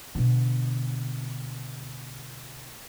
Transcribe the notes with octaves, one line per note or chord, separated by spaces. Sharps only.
B2 D3